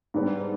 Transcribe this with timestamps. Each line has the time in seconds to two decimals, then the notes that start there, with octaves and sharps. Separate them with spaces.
0.14 G#2 G3 B3 D4